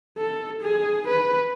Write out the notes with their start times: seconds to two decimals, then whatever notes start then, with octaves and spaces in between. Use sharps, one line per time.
0.18 A4
0.61 G#4
1.08 B4